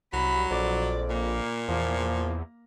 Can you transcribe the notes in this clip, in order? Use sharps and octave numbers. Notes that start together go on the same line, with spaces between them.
C2 F#3 B5
A#1 F2 D5
A#2 A#3
E2 F3 A#3